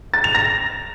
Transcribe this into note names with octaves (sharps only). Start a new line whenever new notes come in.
A6
F7
A#6